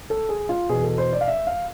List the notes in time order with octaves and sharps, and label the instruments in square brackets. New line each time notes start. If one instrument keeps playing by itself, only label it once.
[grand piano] A4
G#4
F4
E2 B2 G#4
A4
C5
D5
F5
E5
F5